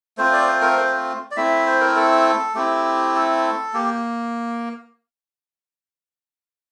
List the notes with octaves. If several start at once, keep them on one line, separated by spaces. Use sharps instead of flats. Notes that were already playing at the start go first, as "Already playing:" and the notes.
A3 C4 F4 C5
D5
C5
A#4
C5
D5
A3 C4 E4 E5
C5
A#4
A4
A3 C4 E4 G4
A4
A#3 G4